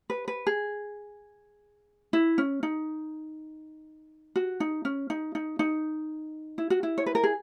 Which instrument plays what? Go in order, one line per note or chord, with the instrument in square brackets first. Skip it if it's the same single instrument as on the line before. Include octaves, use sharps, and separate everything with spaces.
[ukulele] B4
B4
G#4
E4
C#4
D#4
F#4
D#4
C#4
D#4
D#4
D#4
E4
F#4
E4
C#5
B4
A#4
G#4